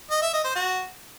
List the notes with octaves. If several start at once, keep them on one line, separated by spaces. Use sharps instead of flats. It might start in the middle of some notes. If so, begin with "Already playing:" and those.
D#5
E5
D#5
C5
F#4